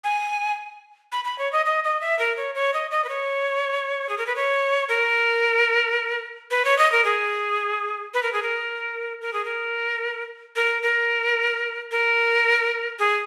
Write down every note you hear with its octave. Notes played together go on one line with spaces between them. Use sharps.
G#5
B5
B5
C#5
D#5
D#5
D#5
E5
A#4
C#5
C#5
D#5
D#5
B4
C#5
G#4
A#4
B4
C#5
A#4
B4
C#5
D#5
A#4
G#4
B4
A#4
G#4
A#4
A#4
G#4
A#4
A#4
A#4
A#4
G#4